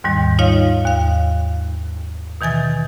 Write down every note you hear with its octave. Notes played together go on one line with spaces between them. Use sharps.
D#2 G#2 D#3 G3
D#4 F4 C#5 D#5 F5
D#2 F5
B2 D#3 E3 G#5 A6